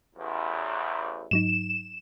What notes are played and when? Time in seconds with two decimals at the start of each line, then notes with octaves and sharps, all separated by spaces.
0.16 A1 E2
1.31 G#2 F#3 D#4 E7